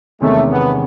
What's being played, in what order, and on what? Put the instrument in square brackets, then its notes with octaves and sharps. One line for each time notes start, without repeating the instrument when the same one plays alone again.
[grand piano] E2 C3 D#3 G#3 C#4 [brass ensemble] A3
[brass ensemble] B3